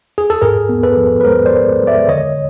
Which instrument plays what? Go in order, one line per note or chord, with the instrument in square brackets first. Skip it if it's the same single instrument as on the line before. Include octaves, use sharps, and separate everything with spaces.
[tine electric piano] G#4
A4
G#2 G#4 A#4
B3
A4 B4
F3
B4
G#3 A#4 C5
C5 D5
G#3
G#3
D5 E5
D3 C#5 D#5